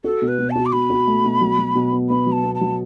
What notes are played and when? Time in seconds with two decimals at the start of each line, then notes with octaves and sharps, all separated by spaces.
0.04 F#4 A4
0.22 B2
0.28 B4
0.39 B2
0.50 A5
0.56 F#4
0.66 D6
0.72 B2 B5
0.90 F#4
1.07 A3
1.24 B2
1.41 F#3
1.58 F#3
1.75 B2
1.92 B3
2.09 B3 B5
2.26 F#3
2.32 A5
2.44 B3
2.55 A5
2.61 F#3